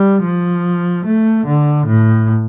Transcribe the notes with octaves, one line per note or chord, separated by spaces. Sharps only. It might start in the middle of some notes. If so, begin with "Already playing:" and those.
Already playing: G3
F3
A3
D3
A2